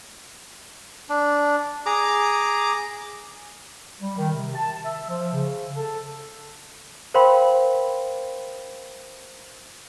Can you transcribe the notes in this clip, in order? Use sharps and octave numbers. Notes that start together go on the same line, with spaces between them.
D4
G#4 A#5 D6
G3
D#3
C3
A5
E5
F3
C#3
A4
A#4 C5 F5 G5 B5 C6